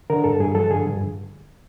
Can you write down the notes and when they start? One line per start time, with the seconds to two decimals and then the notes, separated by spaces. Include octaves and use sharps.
0.10 D3 A#4
0.24 G2 A4
0.40 G2 G#4
0.54 F3 A4
0.70 D3 G#4
0.86 G2